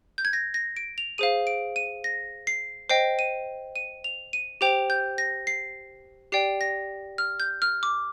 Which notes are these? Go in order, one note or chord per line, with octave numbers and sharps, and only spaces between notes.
G6
G#6
A#6
A#6
D7
F7
G#4 C5 F5 D#7
D7
D#7
A#6
C7
C5 D#5 G5 C7
D#7
D#7
F7
D#7
G4 C5 G5 F7
G6
A#6
C7
G4 D5 G5 C7
A#6
F6
G6
F6
D6